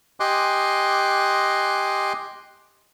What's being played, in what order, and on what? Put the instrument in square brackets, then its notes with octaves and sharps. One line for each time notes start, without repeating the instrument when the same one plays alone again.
[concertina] G4 D#5 G#5 C6 D6 F#6